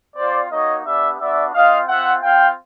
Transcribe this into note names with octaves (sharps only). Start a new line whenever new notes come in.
C4 F4 C5 D5
A#3 D#4 F#4 C#5 D#5
B3 D4 G4 D5 E5
B3 D4 F#4 D5 E5
C4 F4 D#5 F5
C4 F4 E5 F#5
C4 F4 F5 G5